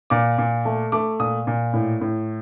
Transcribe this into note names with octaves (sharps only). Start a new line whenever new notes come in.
A#2 D6
A#2
A3
A3 D6
A#2 D#6
A#2
A2
A2